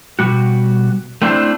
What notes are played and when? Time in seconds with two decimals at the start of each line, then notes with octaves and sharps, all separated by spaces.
0.19 B2 G3 F#4
1.22 A3 C4 D4 E4 C5